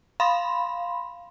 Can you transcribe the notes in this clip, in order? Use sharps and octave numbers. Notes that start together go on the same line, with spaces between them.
F5 B5 C6